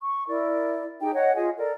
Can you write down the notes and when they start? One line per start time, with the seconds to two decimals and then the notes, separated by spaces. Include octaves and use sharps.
0.02 C#6
0.27 E4 A#4 D5
1.01 D#4 G4 G#4 G5
1.14 C#5 D#5 F#5
1.35 F4 G#4 D#5 G#5
1.58 A4 A#4 D5